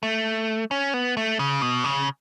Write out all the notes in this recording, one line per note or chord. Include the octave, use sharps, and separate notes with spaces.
A3
C#4
B3
A3
C#3
B2
C#3